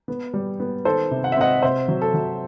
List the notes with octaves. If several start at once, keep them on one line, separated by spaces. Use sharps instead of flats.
B3
G3
B3
D#3 A4 C5
C3
F#5
E5
C4 D#5 F#5
C3 C5 E5
F#3
A4
F#3